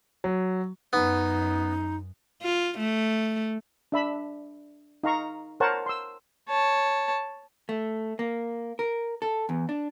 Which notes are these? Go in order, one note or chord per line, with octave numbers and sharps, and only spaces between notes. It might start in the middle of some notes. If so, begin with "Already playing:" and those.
F#3
F#2 B3 D#4
F4
A3
D4 E5 B5
D#4 F5 A#5 C#6
A#4 C5 C#5 F#5 A5 C#6
C6 E6
C#5 A5
A3
A#3
A#4
A4
E2
D4